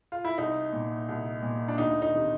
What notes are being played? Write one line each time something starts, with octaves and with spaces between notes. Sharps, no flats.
F4
E4
C2 D#4
A#2
C2
A#2
D4
D2 D#4
D#4
C3 D#3